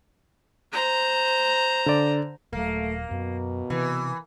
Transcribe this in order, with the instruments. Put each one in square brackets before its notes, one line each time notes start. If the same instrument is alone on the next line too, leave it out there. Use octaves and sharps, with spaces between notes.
[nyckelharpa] C5 A#5
[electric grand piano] D3 D5
[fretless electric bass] D#1 F#3 [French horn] A3 [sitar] A#3
[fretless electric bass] F#2 [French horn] B2
[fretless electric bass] C3 [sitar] E3